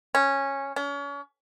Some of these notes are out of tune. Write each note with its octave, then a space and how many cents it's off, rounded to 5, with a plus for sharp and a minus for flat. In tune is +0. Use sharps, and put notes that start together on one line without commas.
C#4 -10
C#4 +35